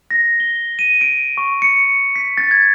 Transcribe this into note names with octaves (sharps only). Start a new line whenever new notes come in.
A#6
G7
D#7
D7
C#6
C#7
B6
A6
G#6